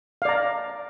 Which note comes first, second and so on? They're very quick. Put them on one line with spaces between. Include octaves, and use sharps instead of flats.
F5 D5 A#5